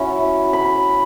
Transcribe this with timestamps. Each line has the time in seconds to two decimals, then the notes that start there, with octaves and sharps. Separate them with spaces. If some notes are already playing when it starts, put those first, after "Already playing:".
Already playing: F#3 C#4 E4
0.53 B5